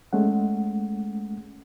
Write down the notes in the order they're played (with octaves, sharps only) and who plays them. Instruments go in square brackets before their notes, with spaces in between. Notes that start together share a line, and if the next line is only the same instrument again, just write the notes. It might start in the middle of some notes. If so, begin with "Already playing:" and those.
[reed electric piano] G#3 A3 C#4 F#5